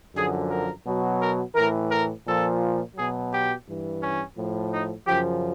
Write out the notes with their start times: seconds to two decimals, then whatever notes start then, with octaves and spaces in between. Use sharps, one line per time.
0.15 F#2 D3 F3 G#4
0.49 A#4
0.85 B2 F#3
1.20 A#4
1.55 A2 E3 A#4
1.90 A#4
2.25 A#2 F3 A4
2.95 B2 F#3 G#4
3.31 G4
3.66 G2 E3
4.01 C#4
4.36 A2 F3
4.72 D#4
5.06 F#2 C#3 F3 G4